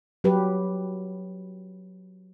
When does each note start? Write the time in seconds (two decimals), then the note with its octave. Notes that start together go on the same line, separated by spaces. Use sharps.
0.24 F#3 G4 B4